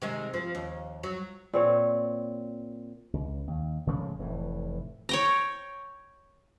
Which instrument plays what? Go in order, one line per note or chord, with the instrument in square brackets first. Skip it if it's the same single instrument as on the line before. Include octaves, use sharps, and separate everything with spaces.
[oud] C3 D#3 G#3
F3
D#2
F#3
[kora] A#2 C4 C#5
[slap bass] C#2
D#2
A2 C#3 F3 G#3
F1 A2 E3
[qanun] C#5 G5 A#5